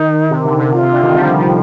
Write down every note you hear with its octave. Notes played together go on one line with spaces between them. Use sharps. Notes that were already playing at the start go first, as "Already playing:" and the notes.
Already playing: D#3 D#4
C3
D3
C3
C3 F4
C3
D3
D#3
G3
F3
D#3
F3